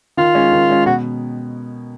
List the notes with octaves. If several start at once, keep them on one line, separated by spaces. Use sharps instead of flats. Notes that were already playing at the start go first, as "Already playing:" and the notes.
D#3 F4
G#3 C#4
D#3
G#3 C#4
B2 F#4